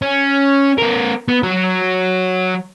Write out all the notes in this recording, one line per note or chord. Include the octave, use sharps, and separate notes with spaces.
C#4
B3 A#4
B3
F#3 F#4